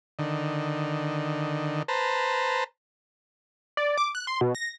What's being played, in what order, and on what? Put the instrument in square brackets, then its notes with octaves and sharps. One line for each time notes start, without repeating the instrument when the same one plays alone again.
[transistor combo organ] D3 D#3
B4 C5 A5 A#5
[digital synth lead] D5
D6
F#6
C6
B2
A#6